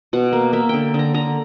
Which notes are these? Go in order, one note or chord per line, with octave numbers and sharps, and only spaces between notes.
B2 F#5
A#3
A#3 E5
D3 G5
D3 A#5
D3 A#5